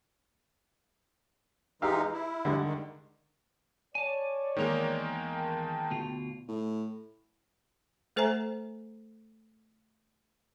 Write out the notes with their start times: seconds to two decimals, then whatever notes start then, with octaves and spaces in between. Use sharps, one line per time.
1.82 E3 G#3 D#4 G4 F5 E6
2.13 E4
2.45 D3 G3 G#3
2.64 D#3
3.95 C#5 D5 G#5 A5
4.57 E2 D#3 G#3 A#3 A#4
5.30 G5 A5
5.91 D2 B2 F4
6.48 A2
8.16 A3 A4 C5 E5 G#5 A#5